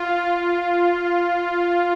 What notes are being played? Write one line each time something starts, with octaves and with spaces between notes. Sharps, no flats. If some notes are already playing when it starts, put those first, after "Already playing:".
Already playing: F4